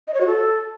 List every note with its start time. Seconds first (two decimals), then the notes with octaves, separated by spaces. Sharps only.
0.07 D#5
0.14 C#5
0.20 F#4
0.27 A4